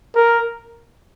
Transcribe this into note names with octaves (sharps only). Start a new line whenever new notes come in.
A#4